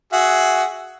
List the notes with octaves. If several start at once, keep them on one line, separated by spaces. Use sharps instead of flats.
F#4 G#4 E5